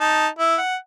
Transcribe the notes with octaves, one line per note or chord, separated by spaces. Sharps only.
D#4 A5
E4
F#5